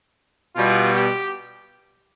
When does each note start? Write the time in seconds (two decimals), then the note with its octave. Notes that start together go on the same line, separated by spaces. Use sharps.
0.56 B2 G3 F4
0.93 G4